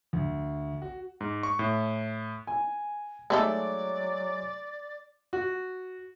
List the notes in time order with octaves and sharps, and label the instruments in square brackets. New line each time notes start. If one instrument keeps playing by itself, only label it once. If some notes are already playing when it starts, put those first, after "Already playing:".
[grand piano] D2
F#4
[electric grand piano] G#2
C#6
A2
[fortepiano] G#5
[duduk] F#3 [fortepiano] G#3 [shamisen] A3 D#4 A4 [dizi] D5
[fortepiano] F#4